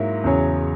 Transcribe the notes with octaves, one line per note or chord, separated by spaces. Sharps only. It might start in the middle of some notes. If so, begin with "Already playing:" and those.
Already playing: G#2 F#3 A#3 E4
E2 C#3 F#3 C#4